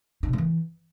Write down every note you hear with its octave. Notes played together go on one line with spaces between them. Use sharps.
D#4
B2
A3
E3